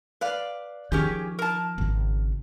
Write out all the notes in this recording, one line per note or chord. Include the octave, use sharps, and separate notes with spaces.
B4 D5 F5
D#3 F3 C#4 G4 G#4
A#4 A5
G#1 C#3